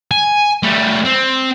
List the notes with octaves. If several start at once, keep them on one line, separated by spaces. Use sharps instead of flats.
G#5
G3 A3
C4